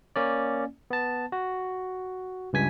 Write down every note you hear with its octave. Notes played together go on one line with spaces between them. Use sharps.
A#3 C#4 D5
B3 A5
F#4
C#2 G2 G#5 B6